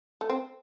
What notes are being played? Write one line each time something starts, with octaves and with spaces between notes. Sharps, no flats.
A3
C4